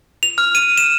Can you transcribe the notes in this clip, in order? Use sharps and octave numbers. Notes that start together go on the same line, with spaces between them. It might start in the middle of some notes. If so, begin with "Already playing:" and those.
F7
F6
D#7
E7